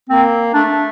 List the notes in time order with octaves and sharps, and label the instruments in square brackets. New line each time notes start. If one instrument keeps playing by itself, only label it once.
[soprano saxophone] A#3 [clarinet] C4
[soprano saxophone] A3 [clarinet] D4